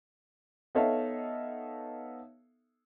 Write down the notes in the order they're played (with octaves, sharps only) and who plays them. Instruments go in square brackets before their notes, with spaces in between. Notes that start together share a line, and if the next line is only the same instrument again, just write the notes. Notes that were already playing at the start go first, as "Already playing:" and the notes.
[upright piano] B3 D#4 A4 C#5 E5 F5